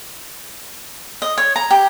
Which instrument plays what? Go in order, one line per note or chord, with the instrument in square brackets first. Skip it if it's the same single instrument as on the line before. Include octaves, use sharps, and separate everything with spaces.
[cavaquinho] D#5
C#5
A#5
G4